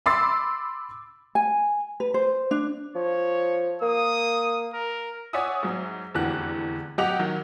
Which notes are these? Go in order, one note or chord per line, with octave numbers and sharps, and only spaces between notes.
B5 C6 D6 E6 A6 C7
G#5
B4
C5
D4
F3 C#5
A#3 D#6
A#4
C#5 D5 E5 F#5 G#5 D#6
G#2 F#3
F1 E2 D3 E3 F#4 F#6
F#3 G4 D#5 F#5 D6 F7
D#3 F#3